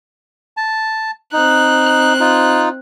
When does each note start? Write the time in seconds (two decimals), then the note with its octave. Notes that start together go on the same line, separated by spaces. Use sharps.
0.57 A5
1.33 C4 D#4 F#6
2.20 D#4 F4